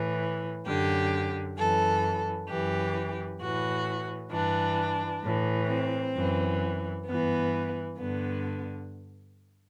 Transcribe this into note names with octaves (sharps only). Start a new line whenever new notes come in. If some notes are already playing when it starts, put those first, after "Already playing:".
Already playing: A2 E3
F#2 D3 G4
F#2 E3 A4
F#2 E3 G4
A2 E3 F#4
G2 E3 D4
A2 E3
C4
F#2 E3
G2 E3 B3
G2 D3 B3